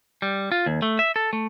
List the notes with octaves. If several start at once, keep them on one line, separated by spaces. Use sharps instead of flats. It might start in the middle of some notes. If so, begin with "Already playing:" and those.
G3
F4
D#2
A3
E5
A4
A3